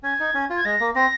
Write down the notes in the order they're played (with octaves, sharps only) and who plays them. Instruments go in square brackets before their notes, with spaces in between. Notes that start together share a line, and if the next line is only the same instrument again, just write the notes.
[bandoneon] C#4 [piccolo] G#6
[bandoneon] D#4
C#4
F4
[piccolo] G#6
[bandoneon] G#3 [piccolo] A#6
[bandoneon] A#3
[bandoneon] C4 [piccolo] A#6